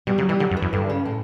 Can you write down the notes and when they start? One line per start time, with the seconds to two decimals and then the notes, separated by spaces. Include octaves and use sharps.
0.07 B2 G3
0.18 C#3 F#3
0.29 E3 G3
0.40 D3 F#3
0.51 F#2
0.57 E3
0.62 F#2
0.73 G2 D3
0.90 C#3
1.05 A2